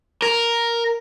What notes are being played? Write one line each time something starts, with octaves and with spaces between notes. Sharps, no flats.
A#4